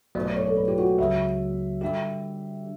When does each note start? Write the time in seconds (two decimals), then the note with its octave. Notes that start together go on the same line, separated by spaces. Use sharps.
0.15 B1 B2 F#3 A3 D5
0.25 D5
0.36 C#5
0.46 A4
0.57 B4
0.68 G4
0.78 F#4
0.98 C#2 C#3 F#3 E5
1.81 D3 G3 D4 G4 E5